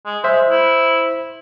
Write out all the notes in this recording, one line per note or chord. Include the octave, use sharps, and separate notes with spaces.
G#3
G#3 C5 E5
E4